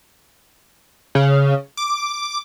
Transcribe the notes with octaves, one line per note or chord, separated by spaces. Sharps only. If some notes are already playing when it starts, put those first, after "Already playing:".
C#3
D6